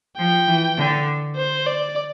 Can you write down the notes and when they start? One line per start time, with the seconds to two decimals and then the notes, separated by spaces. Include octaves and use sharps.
0.18 F3 G5
0.47 E3
0.77 D3
1.36 C5
1.67 D5